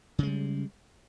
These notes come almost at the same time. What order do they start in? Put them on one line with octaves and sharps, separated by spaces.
C#3 G#3 G3